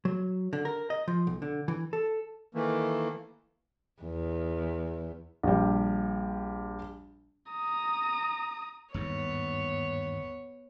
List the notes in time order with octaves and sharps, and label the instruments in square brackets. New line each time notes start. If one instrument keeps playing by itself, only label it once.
[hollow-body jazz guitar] F#3
D3
A#4
D#5
F3
B1
D3
E3
A4
[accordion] D#3 E3 A3 A#3
[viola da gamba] E2
[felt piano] A#1 G3
[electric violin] A#5 D#6
[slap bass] G1 D#2 G#2 [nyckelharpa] B3 C#5